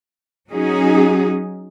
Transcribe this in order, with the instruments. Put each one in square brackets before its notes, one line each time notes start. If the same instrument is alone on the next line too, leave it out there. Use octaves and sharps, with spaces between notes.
[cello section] F#3 C#4 D#4 F#4 G#4